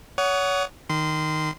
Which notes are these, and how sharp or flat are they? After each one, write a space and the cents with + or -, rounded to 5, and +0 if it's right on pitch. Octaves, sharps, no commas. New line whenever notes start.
C#5 +30 F#5 +5 D#6 -10
D#3 -5 C6 -20